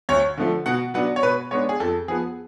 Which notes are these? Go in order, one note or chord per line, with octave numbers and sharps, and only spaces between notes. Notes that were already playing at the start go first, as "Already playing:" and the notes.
D2 C#5
D3 F3 A3
B2 F#5
F#3 B3 D4 F#5
C#5
B2 B4
G#3 B3 D4 C#5
G#4
F2 A4
F3 B3 G#4